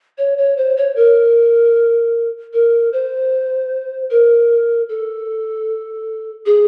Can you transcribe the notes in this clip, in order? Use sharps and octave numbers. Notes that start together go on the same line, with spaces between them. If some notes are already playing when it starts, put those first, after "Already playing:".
C#5
C#5
C5
C#5
A#4
A#4
C5
A#4
A4
G#4